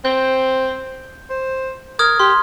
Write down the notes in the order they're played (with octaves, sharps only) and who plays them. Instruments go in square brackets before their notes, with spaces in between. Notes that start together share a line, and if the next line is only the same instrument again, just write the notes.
[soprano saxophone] C4 [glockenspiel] G6
[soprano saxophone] C5
[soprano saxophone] A#4 [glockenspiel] D#6 F6 G#6
[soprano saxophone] G4 [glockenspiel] C6